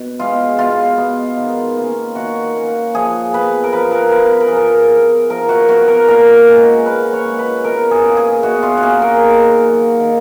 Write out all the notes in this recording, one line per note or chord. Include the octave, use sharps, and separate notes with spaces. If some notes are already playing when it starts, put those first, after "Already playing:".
Already playing: B2
G#3 B3 F4
B2 F4
G#3 B3
D#3
A#3 C#4
D#3 F#4
A#3 C#4
F3 G#4
B3 B4
A#4
F3 B4
A#4
B3 B4
B4
A#4
F3 G#4
A#4
B3
F3 A#4
F#4
B3 F#4
A#4
A#2 A#4
G#3 C#4
A#2 B4
C#5
G#3 C#4
B4
B2 A#4
G#4
A#3 C#4
G#4
B2 F#4
F4
F#4
A#3 C#4 G#4
A#4
D#3
F#3 A#3
D#3